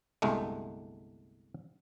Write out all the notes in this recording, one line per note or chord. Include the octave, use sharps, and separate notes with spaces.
G1 C2 G#3 A3